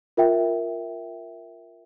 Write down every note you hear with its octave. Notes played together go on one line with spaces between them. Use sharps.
F4 A#4 E5 G5